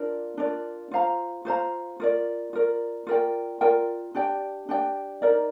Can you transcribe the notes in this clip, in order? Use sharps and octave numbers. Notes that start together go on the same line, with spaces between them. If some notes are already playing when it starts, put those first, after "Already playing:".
Already playing: D4 F4 A#4 D5
D4 F4 A#4 D5
F4 C5 F5 A#5
F4 C5 F5 A#5
F4 A#4 D5
F4 A#4 D5
F4 A#4 D5 G5
F4 A#4 D5 G5
D4 G4 D5 G5
D4 G4 D5 G5
D#4 A#4 D5